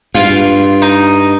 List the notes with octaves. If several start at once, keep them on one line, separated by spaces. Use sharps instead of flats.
G2 F4
D#4